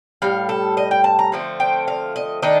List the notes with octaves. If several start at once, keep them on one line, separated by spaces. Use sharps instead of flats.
A2 G3 F5
A4
D#5
G5
A5
A#5
D3 F3 A3 C4
G5
F5
D#5
D#3 A3 D4 D#5